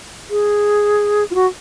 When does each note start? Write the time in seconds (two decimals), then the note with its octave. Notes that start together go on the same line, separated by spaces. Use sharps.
0.30 G#4
1.30 F4
1.34 F#4